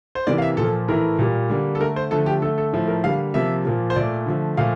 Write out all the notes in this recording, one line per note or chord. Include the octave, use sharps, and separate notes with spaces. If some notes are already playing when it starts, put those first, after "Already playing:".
C5
C3 E3 A#3 D5
F5
E5
A#2 F3 A#3 A4
A2 E3 A3 A#4
A#2 G3 A#3
D3 G3 A#3
A4
D3 A3 A#4
C5
D3 F3 A3 A4
G4
D3 A3 A4
A4
A2 F3 A3
A#4
D3 G3 A#3 F5
C3 F3 A#3 E5
A#2 F3 A#3
C5
A#2 A3 D5
D3 F3 A3
A#2 F3 A3 F5